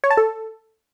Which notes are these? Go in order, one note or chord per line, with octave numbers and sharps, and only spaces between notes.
C#5
A5
A4